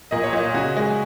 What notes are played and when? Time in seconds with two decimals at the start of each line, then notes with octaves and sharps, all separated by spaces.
0.11 A#2 D#5
0.23 C#5
0.33 A#2 D#5
0.54 C#3 F#4
0.77 G#3